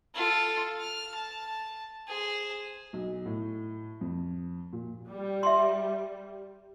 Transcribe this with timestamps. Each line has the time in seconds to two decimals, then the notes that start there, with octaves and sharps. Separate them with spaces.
0.15 F4 A4
0.80 F6
1.15 A5
2.08 G#4 C5
2.93 B1
3.26 A2
4.01 F2
4.73 A#2
5.10 G3
5.43 E5 C6